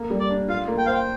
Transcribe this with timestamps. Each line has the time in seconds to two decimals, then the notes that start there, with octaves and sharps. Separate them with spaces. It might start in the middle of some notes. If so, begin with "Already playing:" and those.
Already playing: A#3
0.10 G3
0.20 D5
0.30 D4
0.48 F4 F5
0.68 A#3
0.78 G5
0.86 C5 F5
0.94 G5